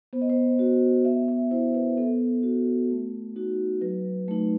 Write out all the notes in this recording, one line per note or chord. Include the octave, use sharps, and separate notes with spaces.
B3 C5
D#5
C5
F#4
B3 E5
E5
E4 C5
B4
B3 A4
F#4
A3
D#4 F#4
F#3 B4
A3 D#4